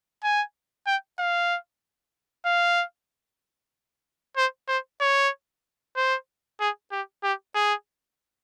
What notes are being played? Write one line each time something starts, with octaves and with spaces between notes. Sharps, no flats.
G#5
G5
F5
F5
C5
C5
C#5
C5
G#4
G4
G4
G#4